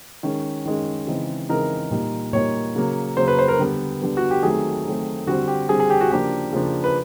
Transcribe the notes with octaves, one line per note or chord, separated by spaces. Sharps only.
D#3 G#3 C#4
D#3 G#3 C#4
C#3 E3 G#3 C4 D#4
C#3 E3 G#3 C4 D#4 A#4
A#2 G3 A#3 D#4
A#2 G3 A#3 D#4 C#5
C#3 F#3 A#3
C#3 F#3 A#3 C5
B4
C5
A#4
D3 G3 B3
D3 G3 B3
F#4
G4
D#3 F#3 A3 C4 G#4
D#3 F#3 A3 C4
D3 G3 C4 F#4
G4
D3 G3 C4 G#4
G#4
G4
F#4
C#3 F3 A#3 D4 G4
C#3 F3 A#3 D4
B4